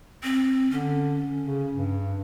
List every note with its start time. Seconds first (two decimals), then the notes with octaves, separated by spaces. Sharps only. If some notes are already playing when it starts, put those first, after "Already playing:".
0.23 C4
0.71 D3 C#4
1.43 C#3
1.74 G2